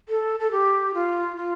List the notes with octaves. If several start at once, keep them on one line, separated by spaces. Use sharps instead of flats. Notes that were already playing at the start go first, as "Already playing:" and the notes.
A4
A4
G4
F4
F4